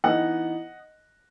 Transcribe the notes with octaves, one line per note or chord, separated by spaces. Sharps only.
E3 B3 D#4 D#5 F#5